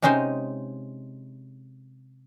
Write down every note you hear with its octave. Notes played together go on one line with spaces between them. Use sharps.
C3 G#3 C#4 D#4 C5 G#5